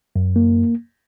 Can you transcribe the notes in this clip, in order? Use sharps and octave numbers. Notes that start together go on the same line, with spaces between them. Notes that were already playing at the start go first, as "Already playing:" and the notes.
F#2
A#3